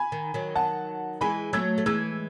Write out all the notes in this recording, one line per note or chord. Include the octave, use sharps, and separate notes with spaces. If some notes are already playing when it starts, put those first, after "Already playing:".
Already playing: G#5 B5
D#3
D#3 F#3
F#5 A5
E3 G#3 G#5 B5
F#3 A3 E6 G#6
A3
E3 G#3 E6 G#6